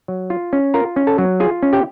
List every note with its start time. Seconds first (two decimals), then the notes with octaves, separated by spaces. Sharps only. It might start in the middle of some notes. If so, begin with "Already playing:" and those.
0.08 F#3
0.30 F4
0.53 C#4
0.74 F4 A#4 A#5
0.96 C#4
1.07 A4 A5
1.18 F#3
1.40 F4 G#4 G#5
1.63 C#4
1.73 G4 G5